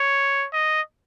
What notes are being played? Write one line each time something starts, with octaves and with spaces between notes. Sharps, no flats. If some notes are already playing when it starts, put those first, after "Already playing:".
Already playing: C#5
D#5